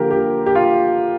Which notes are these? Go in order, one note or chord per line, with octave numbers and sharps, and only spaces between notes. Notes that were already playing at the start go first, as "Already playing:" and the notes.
Already playing: D3 F3 A#3 G4 A#4
G4
G4
F4